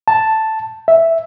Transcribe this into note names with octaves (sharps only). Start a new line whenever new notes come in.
A5
E5